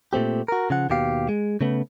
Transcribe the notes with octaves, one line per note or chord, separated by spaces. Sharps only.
A#2 A3 C4 G4
F#4 A#4
C#3 F3 F#5
D#2 B2 G4 F5
G#3
C#3 A3 B3